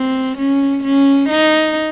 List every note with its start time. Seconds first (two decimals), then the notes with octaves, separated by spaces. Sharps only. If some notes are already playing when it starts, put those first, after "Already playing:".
Already playing: C4
0.38 C#4
0.84 C#4
1.29 D#4